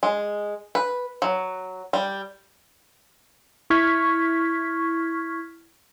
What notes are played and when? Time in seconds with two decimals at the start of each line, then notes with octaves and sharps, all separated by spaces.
0.03 G#3
0.75 B4
1.22 F#3
1.93 G3
3.70 E4 C#6 F6 G#6 B6